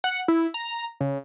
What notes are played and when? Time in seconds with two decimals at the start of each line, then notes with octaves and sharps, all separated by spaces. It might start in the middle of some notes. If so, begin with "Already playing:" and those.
0.04 F#5
0.28 E4
0.54 A#5
1.00 C#3